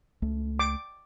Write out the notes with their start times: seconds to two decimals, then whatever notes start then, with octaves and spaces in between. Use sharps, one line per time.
0.22 C#2 A3
0.59 D6